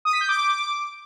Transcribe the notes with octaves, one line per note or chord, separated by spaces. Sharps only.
D#6
B6
G6
D6